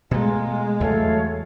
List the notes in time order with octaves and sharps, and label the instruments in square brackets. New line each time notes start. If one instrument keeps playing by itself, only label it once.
[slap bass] B2 A3 [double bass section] G#3 [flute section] F4 A#5
[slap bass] E2 C#3 [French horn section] F#3 A3 [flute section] A4 C#5 F5